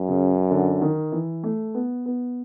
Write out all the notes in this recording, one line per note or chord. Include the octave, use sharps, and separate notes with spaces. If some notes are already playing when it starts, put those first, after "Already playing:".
Already playing: F#2
C#3
D3
D#3
E3
A3
B3
B3